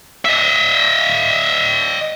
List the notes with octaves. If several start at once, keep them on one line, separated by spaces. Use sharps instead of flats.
D#5 E5